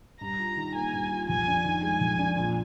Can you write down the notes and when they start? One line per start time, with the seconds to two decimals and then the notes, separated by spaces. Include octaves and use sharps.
0.21 G2 A#5
0.39 F4
0.57 D#3
0.74 A#3 G#5
0.93 G2
1.11 F4
1.28 F2 G#5
1.47 D4
1.64 D#3
1.83 G#3 G#5
2.01 F2
2.19 D4
2.36 A#2